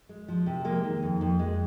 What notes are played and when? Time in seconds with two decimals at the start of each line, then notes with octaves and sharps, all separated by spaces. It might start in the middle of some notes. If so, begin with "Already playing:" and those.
0.09 G#3
0.28 F3
0.46 C3
0.65 G#3 A#3
0.84 D#3
1.03 F2
1.21 F2
1.39 G#3